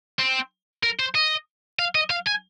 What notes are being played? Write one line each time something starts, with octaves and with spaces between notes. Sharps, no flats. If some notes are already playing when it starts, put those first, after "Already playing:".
C4
A#4
C5
D#5
F5
D#5
F5
G#5